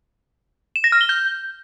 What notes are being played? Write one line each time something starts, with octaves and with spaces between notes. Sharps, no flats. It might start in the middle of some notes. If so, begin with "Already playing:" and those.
E7
A#6
F6
G7
G6